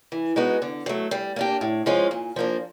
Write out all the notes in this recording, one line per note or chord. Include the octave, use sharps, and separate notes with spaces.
E3
G#3 B3 D#4 F#4
D3
F#3 A3
G3
A#3 D4 G4
A2
F3 G#3 C#4 F4
A#2
F3 A#3 D4